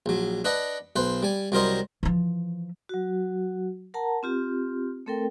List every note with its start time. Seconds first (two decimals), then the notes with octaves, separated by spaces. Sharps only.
0.06 A#1 F#3
0.45 D4 B4 D#5 F#5
0.96 B1 B4 C5
1.23 G3 G#5
1.52 C2 F#3 G3 A#4 C5 D#5
2.03 E3 F3
2.89 F#3 F#4
3.94 A#4 F#5 A5 A#5
4.23 C4 F4 G4
5.06 A3 C4 A4 A#4 G5